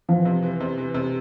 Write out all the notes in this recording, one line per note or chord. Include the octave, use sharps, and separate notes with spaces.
E3 F3
C3
E3
C3
E3
C3